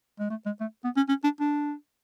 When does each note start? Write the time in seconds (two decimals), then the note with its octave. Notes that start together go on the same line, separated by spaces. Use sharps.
0.19 G#3
0.30 A3
0.46 G#3
0.61 A3
0.84 B3
0.97 C#4
1.09 C#4
1.24 D4
1.40 D4